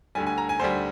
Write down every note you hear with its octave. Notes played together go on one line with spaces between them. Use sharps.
D2 D3 G3 G#5
G#5
A#5
G#5
D2 D3 G3 C5